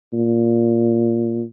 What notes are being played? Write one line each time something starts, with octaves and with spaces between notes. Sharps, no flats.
A#2